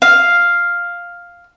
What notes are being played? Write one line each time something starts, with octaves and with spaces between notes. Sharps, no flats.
F5